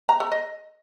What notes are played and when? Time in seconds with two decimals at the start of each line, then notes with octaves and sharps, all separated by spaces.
0.09 A#5
0.20 A4
0.32 D#5